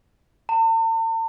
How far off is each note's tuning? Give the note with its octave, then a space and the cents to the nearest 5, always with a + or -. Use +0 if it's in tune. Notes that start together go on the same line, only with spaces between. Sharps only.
A5 +45